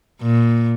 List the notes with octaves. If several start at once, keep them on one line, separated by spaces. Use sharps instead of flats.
A#2